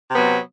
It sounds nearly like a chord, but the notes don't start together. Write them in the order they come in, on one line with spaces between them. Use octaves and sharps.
C3 B3 F#3